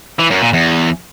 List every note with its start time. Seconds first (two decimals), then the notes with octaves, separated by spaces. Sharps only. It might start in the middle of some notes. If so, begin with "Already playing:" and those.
0.19 E3
0.31 F#2
0.42 A#2
0.53 E2